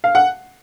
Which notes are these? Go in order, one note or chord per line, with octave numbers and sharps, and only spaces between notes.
F5
F#5